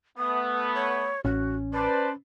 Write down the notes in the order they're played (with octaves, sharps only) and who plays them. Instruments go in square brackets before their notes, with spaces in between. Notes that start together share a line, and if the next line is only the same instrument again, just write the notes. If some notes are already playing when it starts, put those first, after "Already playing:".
[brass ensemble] A3 B3 [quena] D#6
[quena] C#5
[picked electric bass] A1 [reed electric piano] C#4 [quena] F#4
[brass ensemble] B4 C5 D5 [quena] A5